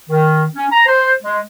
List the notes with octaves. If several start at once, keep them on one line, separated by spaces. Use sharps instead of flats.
D#3
C#4
A#5
C5
G#3